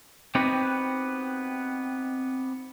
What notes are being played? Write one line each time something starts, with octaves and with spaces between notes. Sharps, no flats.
B3 C4 D#4 F#4 G4 B4